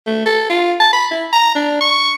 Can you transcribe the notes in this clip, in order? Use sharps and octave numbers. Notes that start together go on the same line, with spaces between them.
A3
A4
F4
A5
B5
E4
A#5
D4
C#6